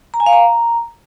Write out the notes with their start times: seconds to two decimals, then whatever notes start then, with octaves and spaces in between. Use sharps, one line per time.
0.14 A#5
0.20 G#5
0.26 F5
0.33 A#5